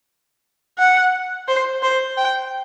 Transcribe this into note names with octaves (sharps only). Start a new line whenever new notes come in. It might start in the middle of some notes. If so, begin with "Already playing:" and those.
F#5
C5
C5
G5